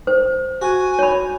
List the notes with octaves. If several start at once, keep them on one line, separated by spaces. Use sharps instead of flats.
C5
F#4 G#5
C#5 B5